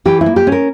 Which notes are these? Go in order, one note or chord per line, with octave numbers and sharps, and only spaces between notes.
E3 G4
E4
A#3
G4
C#4
A#4